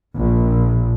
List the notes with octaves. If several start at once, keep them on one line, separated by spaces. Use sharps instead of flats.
A#1